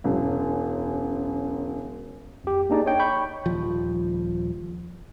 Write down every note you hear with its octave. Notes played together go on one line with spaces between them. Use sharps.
E1 F#2
F2 G4
A#3 D4 D#4 G#4 D5
C#5 D#5 G5
B5 C#6 G6
D#1 F3